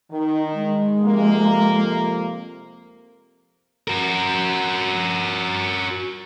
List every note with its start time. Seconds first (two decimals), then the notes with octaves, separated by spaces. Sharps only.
0.11 D#3 D#4
0.55 G#3
1.04 F2 C3 A#3
3.88 F#4 A#4